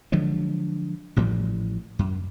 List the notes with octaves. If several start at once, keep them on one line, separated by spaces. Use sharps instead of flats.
D3 F3 F#3 G#3
A1 A2 F3 G3
F#2